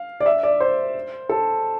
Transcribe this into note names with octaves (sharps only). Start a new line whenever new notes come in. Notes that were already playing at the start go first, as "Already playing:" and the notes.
Already playing: F5
D5
E5
D5
C5
A4